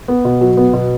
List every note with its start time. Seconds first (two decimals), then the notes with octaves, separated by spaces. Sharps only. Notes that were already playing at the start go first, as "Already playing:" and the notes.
0.08 B3
0.25 B2
0.41 F#3
0.57 B3
0.73 B2